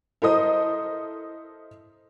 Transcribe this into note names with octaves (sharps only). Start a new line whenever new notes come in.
E4 A4 A#4 C5 D#5 D#6